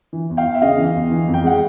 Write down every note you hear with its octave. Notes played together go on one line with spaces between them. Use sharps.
E3
E2
F5 G5
E2
E5
C#3 D#5 F5
E3
E2
E3
F2
G5
G#3 F#5